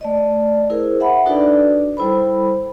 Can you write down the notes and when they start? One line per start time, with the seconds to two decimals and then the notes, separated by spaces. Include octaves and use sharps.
0.01 A3 D5 D#5
0.70 E4 G#4 A#4 C5
1.00 E5 F#5 G#5 B5
1.26 D4 D#4 F#4 A4 B4 D5
1.97 G3 E4 A4 C5 B5